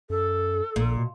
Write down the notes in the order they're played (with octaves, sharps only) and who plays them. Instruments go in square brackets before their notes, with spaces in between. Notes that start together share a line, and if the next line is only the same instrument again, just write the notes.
[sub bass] F#2 [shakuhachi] A4
[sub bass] A#1 [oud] A#2
[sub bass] B2